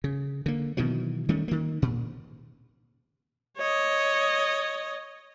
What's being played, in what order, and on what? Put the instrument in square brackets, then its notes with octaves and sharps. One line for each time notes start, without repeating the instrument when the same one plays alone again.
[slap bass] C#3
D3 A#3
B2 D#3 E3 F#3
D#3 G3 A3 C#4
D#3 A#3
A#2
[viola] C#5 D#5